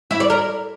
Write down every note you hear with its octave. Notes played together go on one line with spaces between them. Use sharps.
E4
D5
A#4